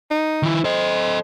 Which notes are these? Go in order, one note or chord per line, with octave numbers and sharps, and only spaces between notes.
D#4
D#3 E4
A4 C5 D#5